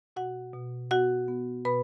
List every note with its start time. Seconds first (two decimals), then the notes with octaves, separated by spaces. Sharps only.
0.16 B2 F#4 F#5
0.54 B2
0.91 B3 F#4 F#5
1.28 B3
1.65 B2 B4 B5